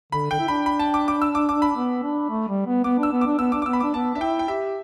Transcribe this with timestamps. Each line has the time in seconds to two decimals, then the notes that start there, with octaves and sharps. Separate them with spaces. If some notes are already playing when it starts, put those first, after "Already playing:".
0.12 D3 B5
0.30 D3 G5
0.39 E4
0.48 D4 B5
0.66 B5
0.79 A5
0.94 D6
1.08 D6
1.22 E6
1.35 D6
1.49 D6
1.62 B5
1.75 B3
2.03 D4
2.30 A3
2.48 G3
2.67 B3
2.84 B3 D6
2.99 D4 E6
3.12 B3
3.21 D4 D6
3.39 B3 E6
3.52 D4 D6
3.62 D6
3.66 B3 E6
3.73 B5
3.80 D4 D6
3.94 B3 A5
4.15 D4 E5
4.20 E4 G5
4.39 G5
4.48 G4 E5